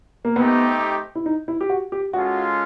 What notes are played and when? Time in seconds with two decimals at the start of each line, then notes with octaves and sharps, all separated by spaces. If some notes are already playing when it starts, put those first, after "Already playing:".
0.25 A#3
0.36 A3 B3 C4 D#4 G4
1.15 E4
1.26 D#4
1.48 E4
1.61 G4
1.69 F#4
1.92 G4
2.13 G#3 C#4 F4 F#4 A4